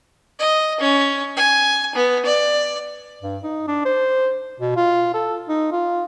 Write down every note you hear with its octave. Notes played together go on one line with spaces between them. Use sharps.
D#5
C#4
G#5
B3
D5
G2
D#4
D4
C5
B2
F4
A4
D#4
F4